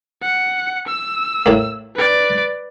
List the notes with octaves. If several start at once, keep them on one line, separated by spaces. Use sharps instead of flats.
F#5
E6
A2 A#3
B4 D5